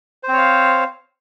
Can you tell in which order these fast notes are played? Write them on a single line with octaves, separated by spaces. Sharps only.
C5 C4 C#5 F5